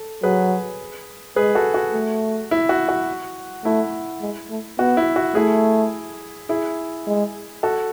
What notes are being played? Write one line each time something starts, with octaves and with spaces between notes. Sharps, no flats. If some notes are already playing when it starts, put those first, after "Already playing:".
Already playing: A4
F#3 G#4 B4
G#3 G#4 B4
F#4 A4
F#4
A3
E4
F#4
F#4
A3 E4
G#3
A3
B3 F#4
E4
F#4
A3 E4 G#4
E4 G#4
G#3
F#4 A4